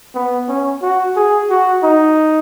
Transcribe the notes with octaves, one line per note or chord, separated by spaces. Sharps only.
B3
C#4
F#4
G#4
F#4
D#4